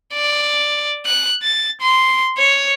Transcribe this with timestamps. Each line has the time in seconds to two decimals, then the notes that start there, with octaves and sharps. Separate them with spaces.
0.14 D5
1.06 F#6
1.43 A6
1.81 C6
2.38 C#5